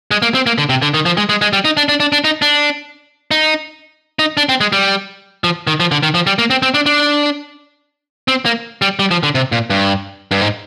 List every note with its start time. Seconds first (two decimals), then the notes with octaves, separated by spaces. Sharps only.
0.11 G#3
0.22 A#3
0.35 C4
0.46 A#3
0.58 D3
0.69 C3
0.82 D3
0.94 D#3
1.06 F3
1.17 G#3
1.29 G#3
1.42 G#3
1.53 G3
1.65 D#4
1.77 D4
1.89 D4
2.00 D4
2.12 D4
2.24 D#4
2.42 D4
3.31 D#4
4.19 D#4
4.37 D4
4.49 C4
4.61 G#3
4.72 G3
5.44 F3
5.67 D#3
5.80 F3
5.92 D3
6.03 D#3
6.14 F3
6.27 G3
6.39 A#3
6.50 C4
6.62 C4
6.74 D4
6.86 D4
8.28 C4
8.46 A#3
8.82 G3
8.99 G3
9.11 F3
9.23 D3
9.35 C3
9.52 A#2
9.70 G2
10.31 G2
10.41 G#2